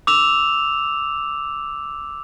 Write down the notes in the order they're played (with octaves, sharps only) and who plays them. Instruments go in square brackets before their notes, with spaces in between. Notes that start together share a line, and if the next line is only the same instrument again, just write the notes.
[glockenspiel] D6 E6 E7 F7